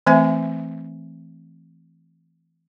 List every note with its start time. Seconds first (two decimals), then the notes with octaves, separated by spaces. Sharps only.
0.07 E3 A3 C4 C5 E5 G#5